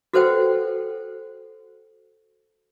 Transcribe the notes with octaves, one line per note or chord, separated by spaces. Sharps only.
F#4 A4 B4 C5 F#5 G5